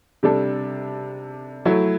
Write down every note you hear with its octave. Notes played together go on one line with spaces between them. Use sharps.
C3 G3 D4 A4
F#3 A3 E4